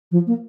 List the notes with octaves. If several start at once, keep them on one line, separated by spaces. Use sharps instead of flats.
F3
A#3